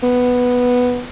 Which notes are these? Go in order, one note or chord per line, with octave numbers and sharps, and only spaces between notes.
B3